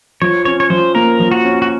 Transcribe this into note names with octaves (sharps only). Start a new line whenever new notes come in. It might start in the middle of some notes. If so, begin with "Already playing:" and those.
F3 C#5
C#4 C#5
C#5
F3 C5
A#3 A#4
F3
F#4
C#4
F#4